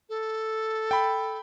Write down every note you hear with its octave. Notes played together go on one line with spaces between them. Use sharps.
A4
G5 B5